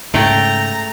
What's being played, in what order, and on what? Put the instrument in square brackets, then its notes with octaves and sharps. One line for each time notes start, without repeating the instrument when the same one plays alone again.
[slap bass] G#2 C#3 [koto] A3 G5 [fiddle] A#5